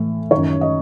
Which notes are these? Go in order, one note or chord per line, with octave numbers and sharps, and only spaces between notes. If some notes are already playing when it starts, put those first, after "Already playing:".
Already playing: A2 E3
F#2 D#3 C#5
D#5